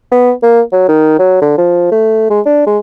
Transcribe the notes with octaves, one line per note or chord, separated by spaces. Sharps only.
B3
A#3
F#3
D#3
F#3
D3
F3
A3
G#3
D4
G#3